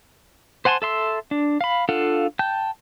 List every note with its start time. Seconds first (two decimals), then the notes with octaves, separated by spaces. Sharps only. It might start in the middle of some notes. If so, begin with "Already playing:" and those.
0.65 C5 F#5 G#5 A5 C6
0.82 A4 E5 C6 E6
1.31 D4
1.61 F5 B5
1.89 D4 F4 A4 F5 F#5
2.39 G5 A5 G6